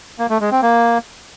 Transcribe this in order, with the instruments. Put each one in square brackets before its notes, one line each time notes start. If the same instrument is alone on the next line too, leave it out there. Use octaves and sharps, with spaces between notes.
[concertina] A#3
A3
G#3
C4
A#3